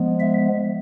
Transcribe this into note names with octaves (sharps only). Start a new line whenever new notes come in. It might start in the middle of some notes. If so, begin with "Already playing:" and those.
Already playing: F3 G#3 B3
E5